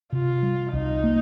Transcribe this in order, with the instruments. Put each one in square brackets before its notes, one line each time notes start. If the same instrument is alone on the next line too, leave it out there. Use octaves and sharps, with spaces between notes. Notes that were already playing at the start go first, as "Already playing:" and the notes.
[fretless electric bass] C3 [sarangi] F4
[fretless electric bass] G3
[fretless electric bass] C2 [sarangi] D#4
[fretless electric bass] A#3